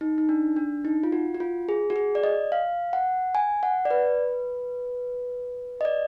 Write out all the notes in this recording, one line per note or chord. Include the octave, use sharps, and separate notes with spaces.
D#4
D#4
D4
D4
D#4
F4
F#4
F#4
F4
G#4
F#4
G#4
D5
D#5
F5
F#5
G#5
F#5
D5
B4
D#5
D5